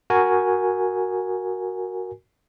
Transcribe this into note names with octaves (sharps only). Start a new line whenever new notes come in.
F#4 A#4 G#5